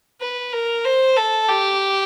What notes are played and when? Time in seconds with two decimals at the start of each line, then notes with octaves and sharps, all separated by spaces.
0.21 B4
0.53 A#4
0.85 C5
1.16 A4
1.48 G4